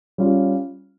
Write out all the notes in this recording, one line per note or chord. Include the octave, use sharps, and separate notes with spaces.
G3 C#4 F4